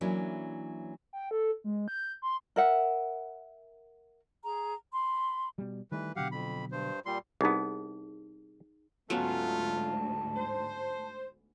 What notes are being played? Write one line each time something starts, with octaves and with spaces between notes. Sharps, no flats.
E3 F#3 A#3 C#4 D4 E4
G5
A4
G#3
G6
C6
A#4 E5 F#5
G#4 A#5
B5 C6
B2 G3
D#3 E3 G3 A3 B4
B2 D3 F#3 G4 F5 F#5
F2 B5
G2 C5
A#2 G3 C6
C2 B3 D#4 G#4
D2 G#2 F#3 A3 B3 C#4 F4 A5
C5